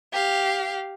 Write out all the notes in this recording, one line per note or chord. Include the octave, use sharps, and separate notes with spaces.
G4 F5